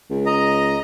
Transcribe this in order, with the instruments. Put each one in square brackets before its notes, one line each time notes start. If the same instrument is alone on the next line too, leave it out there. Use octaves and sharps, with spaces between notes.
[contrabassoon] C#2
[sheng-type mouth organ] D#5 A#5